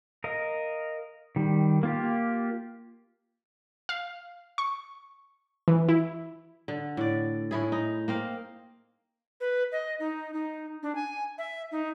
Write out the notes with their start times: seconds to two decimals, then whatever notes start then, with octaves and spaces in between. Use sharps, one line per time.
0.24 A#4 D#5 F5
1.36 D#3 G3
1.83 A#3 F4 G4
3.89 F5
4.58 C#6
5.68 E3
5.89 E4
6.68 D3
6.97 A2 D5
7.51 A2 E4 G#4
7.72 D#4
8.08 A#3 C4 F5
9.40 B4
9.72 D#5
10.00 D#4
10.34 D#4
10.83 D4
10.95 G#5
11.38 E5
11.72 D#4